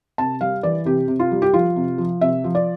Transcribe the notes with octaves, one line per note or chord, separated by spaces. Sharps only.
C3 A5
G3 F5
E3 D5
C3 G4
C3
F4
G3
G4
F3 F4
C3
F3
C3 E5
F3
D5